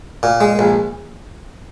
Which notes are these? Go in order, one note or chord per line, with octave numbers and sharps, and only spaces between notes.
A#2
G#3
A#1